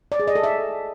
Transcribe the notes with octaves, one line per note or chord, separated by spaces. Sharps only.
D5
G#4
D#5
A4
E5